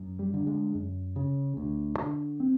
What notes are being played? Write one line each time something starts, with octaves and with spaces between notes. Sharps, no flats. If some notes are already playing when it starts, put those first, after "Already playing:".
Already playing: F#2
G3
D3
G#3
F#2
C#3
D2
D3
C4